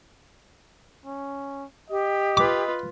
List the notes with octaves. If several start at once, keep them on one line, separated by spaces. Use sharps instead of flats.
C#4
G4 D#5
F4 B4 D6